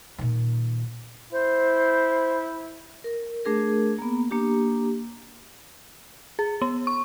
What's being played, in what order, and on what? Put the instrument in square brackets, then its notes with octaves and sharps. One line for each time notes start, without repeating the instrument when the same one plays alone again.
[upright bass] A#2 D#3
[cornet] E4 [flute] C5
[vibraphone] A#4
A3 D4 G#4 A#4
A#3 B3
A#3 D4 G4
[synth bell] G#4
B3
C#6